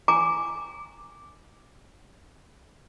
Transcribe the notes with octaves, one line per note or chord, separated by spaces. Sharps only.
G5 G#5 A#5 D6